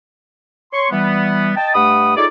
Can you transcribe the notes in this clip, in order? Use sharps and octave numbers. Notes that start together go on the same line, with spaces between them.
C#5 C6 C#6
E3 G3 B3
D#5 G5 A5
G2 A3 F#5 B5 D#6
D#4 F4 G#4 A4 C#5 D5